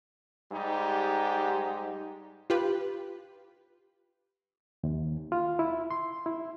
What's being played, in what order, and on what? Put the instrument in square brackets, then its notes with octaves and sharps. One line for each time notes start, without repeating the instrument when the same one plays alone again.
[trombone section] G#2 G3 D#4 G4
[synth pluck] F4 G4 B4
[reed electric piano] D#2
F4
E4
C6
E4